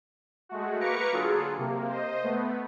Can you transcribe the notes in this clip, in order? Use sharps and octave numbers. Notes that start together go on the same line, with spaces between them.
G#3 A3 F#4
A#3 B4 A#5 C#6 D6 C#7
D3 F#3 F4 G#4 A4
C3 A#3
C5 D#5
A3 B3